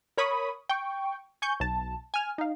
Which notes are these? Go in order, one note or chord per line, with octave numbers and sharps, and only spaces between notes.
A#4 C#5 B5 C#6 D#6
G5 C#6
G#5 C#6 G6
B1 A5
G#5 F6
D#4 F5